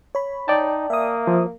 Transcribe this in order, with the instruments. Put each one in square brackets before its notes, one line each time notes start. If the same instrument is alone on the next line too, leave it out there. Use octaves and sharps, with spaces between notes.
[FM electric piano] C#5 B5
[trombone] D#4 [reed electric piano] D5 G5 A5
[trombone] A#3 [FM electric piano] E5 D#6
[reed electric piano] F3